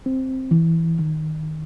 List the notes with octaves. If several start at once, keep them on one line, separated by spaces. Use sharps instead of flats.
C4
E3
D#3